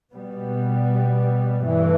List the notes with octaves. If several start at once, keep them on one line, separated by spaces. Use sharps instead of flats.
B2 G3 B3
G2 E3 A3